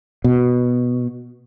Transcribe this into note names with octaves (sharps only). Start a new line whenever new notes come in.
B2